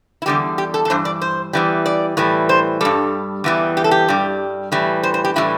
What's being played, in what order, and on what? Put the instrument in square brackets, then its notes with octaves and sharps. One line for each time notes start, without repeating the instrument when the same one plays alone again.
[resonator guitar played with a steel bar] E4
E2 D3 G3 G4
G4
A4
A4
G2 E3 C5
D5
C5
E2 E3 G3
D5
A2 E3 G3
C5
G2 G3 A4
E2 E3 G3
G4
A4
G4
G2 G3
A2 E3 G3
C5
C5
G4
A2 E3 G3 E4